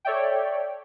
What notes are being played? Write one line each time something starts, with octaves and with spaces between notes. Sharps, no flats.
A4 C#5 D5 E5 G5